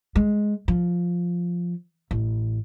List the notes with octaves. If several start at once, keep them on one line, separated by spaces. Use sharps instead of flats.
G#3
F3
A1